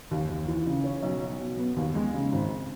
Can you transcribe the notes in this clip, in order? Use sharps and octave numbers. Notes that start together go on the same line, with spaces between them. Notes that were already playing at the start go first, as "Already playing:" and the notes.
D#2
D#2
E3
C#3
C#4
B1
F#3
B2
B3
D#2
G#3
C#3
G#1